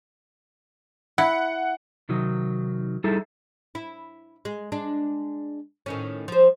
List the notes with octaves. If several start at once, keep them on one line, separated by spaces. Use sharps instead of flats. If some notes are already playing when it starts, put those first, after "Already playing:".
E4 F#5
C3 D#3 F#3 D#4
G3 D#4 E4 G#4 A4
E4
G#3
G#3 D4
A2 D#3 C#4
F3 C5